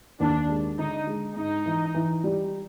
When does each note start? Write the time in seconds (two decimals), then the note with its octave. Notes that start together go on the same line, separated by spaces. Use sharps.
0.20 D#2 D4
0.49 G#3
0.79 D3 D#4
1.07 G#3
1.37 G#2 D#4
1.66 E3
1.95 E3
2.24 G3